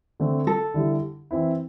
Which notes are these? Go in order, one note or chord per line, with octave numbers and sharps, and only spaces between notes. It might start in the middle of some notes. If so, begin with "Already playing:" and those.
D3 A3 C4
A4
D3 G3 E4
E3 C4 E4